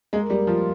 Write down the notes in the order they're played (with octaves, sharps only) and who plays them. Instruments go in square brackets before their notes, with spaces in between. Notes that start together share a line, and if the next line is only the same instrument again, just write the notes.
[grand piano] G#3 [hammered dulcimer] A#3
[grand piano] G3
[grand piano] F3 [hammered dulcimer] F4